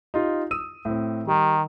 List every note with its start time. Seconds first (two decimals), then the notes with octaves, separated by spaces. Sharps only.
0.14 D#4 F4 G4
0.51 D#6 E6 D#7
0.85 A2 C4
1.27 D#3 G3